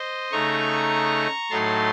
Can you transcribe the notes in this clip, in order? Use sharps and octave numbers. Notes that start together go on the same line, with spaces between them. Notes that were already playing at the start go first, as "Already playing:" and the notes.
Already playing: C5 D#5
C#3 A3 D#4 A#5 C#6
A2 F#3 A3 D#4 A5 C6